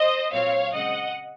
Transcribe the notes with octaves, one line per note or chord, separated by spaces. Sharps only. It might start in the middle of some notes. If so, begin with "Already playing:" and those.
Already playing: C5 D#5
A#2 F#3 C4 C#5 F5
C#3 G#3 C4 D#5 F#5